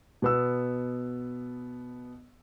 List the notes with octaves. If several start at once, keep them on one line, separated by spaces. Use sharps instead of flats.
B2 B3 E6